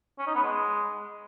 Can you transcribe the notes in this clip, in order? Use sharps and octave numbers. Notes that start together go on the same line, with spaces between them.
C#4
D#4
B3
G#3